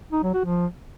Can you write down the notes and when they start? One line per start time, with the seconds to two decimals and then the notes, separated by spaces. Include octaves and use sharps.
0.12 D#4
0.23 F#3
0.34 F#4
0.45 F3